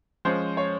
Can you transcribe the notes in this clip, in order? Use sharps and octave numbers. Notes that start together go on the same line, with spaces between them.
F3 G#3 C#4 C5
C#5